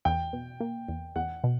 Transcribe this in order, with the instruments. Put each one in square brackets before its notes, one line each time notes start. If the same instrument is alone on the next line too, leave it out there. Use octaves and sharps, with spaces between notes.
[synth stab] E2 [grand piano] G5
[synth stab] B2
A#3
E2
[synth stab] E2 [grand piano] F#5
[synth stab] B2